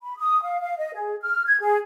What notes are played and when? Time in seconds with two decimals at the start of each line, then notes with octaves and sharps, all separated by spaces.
0.03 B5
0.17 D#6
0.43 F5
0.62 F5
0.78 D#5
0.94 G#4
1.21 F6
1.47 G#6
1.61 G#4